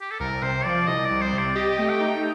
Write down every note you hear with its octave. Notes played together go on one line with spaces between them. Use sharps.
G4
A4
C2 A#4
C3 C5
F3 D5
C2 D#5
C2 D5
C5
C3
D5
G4 D#5
A3
G5
D#4